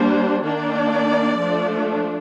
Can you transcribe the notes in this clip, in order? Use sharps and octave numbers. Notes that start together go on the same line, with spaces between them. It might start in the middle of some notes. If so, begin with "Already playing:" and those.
Already playing: G3 A#3 D4 C5
D#3 A#3 D4 D5
F3 A3 D4